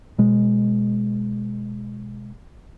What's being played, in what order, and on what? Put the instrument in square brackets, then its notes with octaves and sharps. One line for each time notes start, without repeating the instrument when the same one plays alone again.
[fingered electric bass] B2 G#3